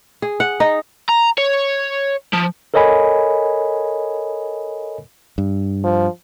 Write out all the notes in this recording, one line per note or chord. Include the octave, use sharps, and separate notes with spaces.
G#4
F#5
D#4
A#5
C#5
F3
A4 A#4 C#5 D#5 G#5 B5
G2
F3